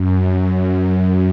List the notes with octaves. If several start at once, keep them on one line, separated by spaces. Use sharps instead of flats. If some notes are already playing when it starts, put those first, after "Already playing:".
Already playing: F#2
F#2
F#2
F#2